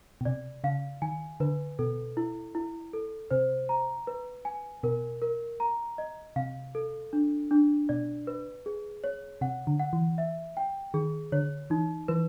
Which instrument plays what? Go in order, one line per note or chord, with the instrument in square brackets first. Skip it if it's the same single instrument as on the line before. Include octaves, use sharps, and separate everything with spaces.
[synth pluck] B2
[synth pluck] C3 [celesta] D5
[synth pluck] C#3 [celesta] F5
[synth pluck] D#3 [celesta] G#5
[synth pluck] D3 [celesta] B4
[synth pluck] B2 [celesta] A4
[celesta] E4
E4
A4
[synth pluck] C3 [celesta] C5
[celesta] A#5
B4
G#5
[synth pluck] B2 [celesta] A#4
[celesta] A#4
A#5
D#5
[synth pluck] C3 [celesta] F5
[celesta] A4
D4
D4
[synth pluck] B2 [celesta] D5
[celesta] B4
G#4
C#5
[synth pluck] C3 [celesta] F#5
[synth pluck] D3
[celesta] F#5
[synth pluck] E3
[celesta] E5
G5
[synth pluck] D#3 [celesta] G#4
[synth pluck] D3 [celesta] C#5
[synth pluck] E3 [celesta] D#4
[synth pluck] E3 [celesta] B4